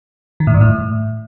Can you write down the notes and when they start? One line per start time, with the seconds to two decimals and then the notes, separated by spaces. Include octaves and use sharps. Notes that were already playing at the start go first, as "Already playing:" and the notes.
0.40 D#3
0.47 A2
0.54 G2
0.61 A2